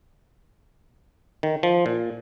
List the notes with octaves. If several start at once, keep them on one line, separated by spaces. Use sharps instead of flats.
D#3
F3
A#2